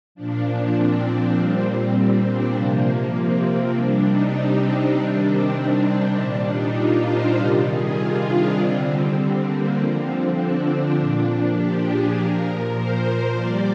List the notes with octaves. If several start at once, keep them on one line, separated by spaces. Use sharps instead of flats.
A#2 F3 D4
D4
C4
C4
A#2 G3
C4
D4
C3 F3 A#3
C4
C3 G3 D4
D#4
C4
C3 D#3 G3 D4
C4
C4
D4
A#2 G3 D4
D#4
F4
C5
C3 D#3 G3
G#4
F4
D4
D3 G3 C4
C4
C4
A#3
D3 F3 C4
D4
D4
A#2 F3 D4
G4
G#4
A#2 F3 A#4
C5
A#2 G3 D5